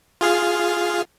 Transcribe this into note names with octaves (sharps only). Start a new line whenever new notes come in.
F4 G#4 F5